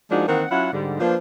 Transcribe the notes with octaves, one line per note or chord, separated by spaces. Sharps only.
F3 G#3 A#3 D4 D#4 F#4
D#3 E3 A#3 C4 F#5
F#3 C#4 E4 F4 F#5
G#2 D3 G3
F3 A#3 D4 F4 B4 C5